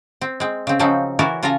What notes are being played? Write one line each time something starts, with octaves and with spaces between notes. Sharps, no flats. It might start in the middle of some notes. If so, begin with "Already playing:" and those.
C4
G#3 C4
C#3 C4
C#3 F3 F#3 C4 C#4 D#4
E3 E4 F#4 A#4 C#5 D5
C#3 F4 A4 G#5 A#5